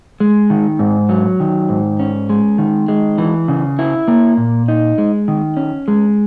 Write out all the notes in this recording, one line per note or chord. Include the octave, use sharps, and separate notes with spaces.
G#3
D#3
G#2
F#3
D#3
G#2
C#4
G#3
D#3
G#3
E3
C#3
E4
A#3
A#2
D#4
G#3
D#3
C#4
G#3